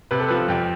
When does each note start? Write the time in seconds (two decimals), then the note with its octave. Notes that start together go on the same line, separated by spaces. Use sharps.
0.11 C3 B4
0.20 A4
0.28 F3 B4
0.48 F2 G4